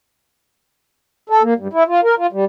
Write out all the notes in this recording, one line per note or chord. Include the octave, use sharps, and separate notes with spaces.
A4
A#3
G2
E4
F4
A#4
F4
G3